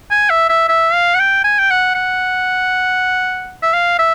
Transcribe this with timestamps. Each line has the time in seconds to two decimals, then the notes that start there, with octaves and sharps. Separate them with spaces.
0.11 G#5
0.30 E5
0.49 E5
0.69 E5
0.93 F5
1.15 F#5
1.19 G5
1.44 G#5
1.59 G5
1.70 F#5
1.95 F#5
3.62 E5
3.74 F5
3.99 E5